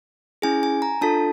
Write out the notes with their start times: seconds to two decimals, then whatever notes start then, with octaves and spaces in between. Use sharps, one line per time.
0.42 C#4 E4 G#4 G#5
0.63 G#5
0.82 A#5
1.01 D4 F4 A4 A5